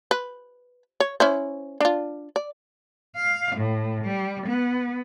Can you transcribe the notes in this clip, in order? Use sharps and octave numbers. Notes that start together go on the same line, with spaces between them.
B4
C#5
C#4 E4 C5
D4 F4
D5
F5
A2
G3
B3